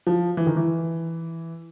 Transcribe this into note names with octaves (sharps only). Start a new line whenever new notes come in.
F3
E3
D#3
E3